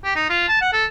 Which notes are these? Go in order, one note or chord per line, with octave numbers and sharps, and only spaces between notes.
G4
D#4
F4
A5
F#5
A4